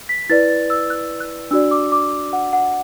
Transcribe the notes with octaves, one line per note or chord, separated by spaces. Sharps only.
B6
E4 B4 D5 A6
A6
E6
F#6
F#6
D4 F#4 D5 E6
D6
D6
F#5
F#5